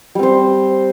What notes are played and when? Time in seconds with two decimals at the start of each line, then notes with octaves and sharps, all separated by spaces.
0.15 G3
0.19 C4
0.23 C5